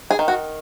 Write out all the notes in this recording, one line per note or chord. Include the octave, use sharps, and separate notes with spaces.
G#4
D#3
F#4